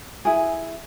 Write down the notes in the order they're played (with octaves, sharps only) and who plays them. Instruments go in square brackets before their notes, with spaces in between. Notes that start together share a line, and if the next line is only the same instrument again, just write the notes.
[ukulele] E4 G#4